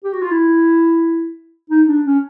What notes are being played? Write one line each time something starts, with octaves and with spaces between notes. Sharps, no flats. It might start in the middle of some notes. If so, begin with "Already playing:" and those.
G4
F#4
F4
E4
D#4
D4
C#4